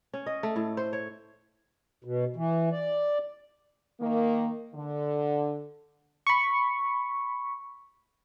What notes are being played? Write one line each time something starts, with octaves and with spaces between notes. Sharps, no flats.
C#4
D#5
A3
A2
C5
C#5
B2
E3
D5
D#3 A#3
D3
B5 C#6